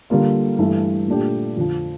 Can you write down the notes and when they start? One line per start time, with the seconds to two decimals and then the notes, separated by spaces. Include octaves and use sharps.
0.10 D3 G3 A#3 F4
0.59 G2 E3 A3
1.08 A#2 A3 D4 G4
1.57 F2 D3 F3